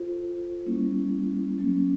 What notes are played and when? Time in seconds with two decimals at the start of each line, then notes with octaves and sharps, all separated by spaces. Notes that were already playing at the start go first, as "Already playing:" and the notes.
Already playing: F4 A4 C5
0.66 G3 A#3 C#4 E4
1.58 F#3 A#3 C#4